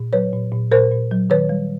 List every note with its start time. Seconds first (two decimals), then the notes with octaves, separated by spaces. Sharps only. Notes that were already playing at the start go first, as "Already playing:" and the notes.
Already playing: A#2
0.13 F#3 B4 C#5
0.33 A#2
0.52 A#2
0.71 A#2 A#4 C5
0.91 A#2
1.11 F#3
1.30 D#3 B4 C#5
1.49 G3